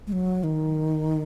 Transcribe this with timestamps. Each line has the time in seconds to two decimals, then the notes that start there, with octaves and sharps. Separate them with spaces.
0.07 G#3
0.12 F#3
0.44 D#3